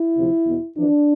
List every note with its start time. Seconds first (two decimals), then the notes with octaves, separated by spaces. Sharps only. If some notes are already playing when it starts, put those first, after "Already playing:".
Already playing: E4
0.16 D2 C3 F3
0.46 E2 B2
0.76 F2 E3 D4